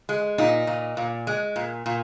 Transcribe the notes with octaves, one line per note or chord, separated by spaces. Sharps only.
G#3
A#2 D#4
A#2
A#2
G#3
A#2
A#2